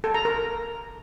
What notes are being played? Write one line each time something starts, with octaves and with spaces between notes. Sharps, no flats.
A4
A#5
A#4